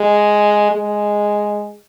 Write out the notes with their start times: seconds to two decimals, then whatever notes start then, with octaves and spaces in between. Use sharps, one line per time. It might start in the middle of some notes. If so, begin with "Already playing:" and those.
Already playing: G#3
0.72 G#3